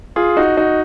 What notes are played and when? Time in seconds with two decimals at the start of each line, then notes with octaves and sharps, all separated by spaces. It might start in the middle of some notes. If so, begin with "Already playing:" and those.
0.16 F4 G#4
0.36 D#4 F#4
0.57 D#4 F#4